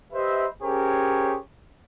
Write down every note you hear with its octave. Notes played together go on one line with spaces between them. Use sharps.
G4 B4 C5 D#5 E5
C#4 G4 G#4 A#4 C5 C#5